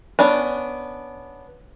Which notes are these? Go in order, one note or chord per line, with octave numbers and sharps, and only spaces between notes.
B3 C#4 D4